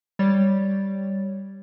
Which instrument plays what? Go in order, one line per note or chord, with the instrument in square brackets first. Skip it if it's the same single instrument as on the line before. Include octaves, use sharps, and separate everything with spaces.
[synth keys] G3 C#5 A6